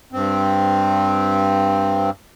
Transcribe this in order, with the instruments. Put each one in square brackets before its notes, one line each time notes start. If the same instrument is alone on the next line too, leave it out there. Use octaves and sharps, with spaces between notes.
[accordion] G2 C4